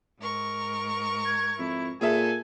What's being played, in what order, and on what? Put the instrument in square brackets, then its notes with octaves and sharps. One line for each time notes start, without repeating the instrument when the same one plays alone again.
[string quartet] G#2 A#4 C#6
[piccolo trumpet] G#6
[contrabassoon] F2 [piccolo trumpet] E4
[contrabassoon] A#2 [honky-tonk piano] G#4 E5 [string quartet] A4 [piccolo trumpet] G#5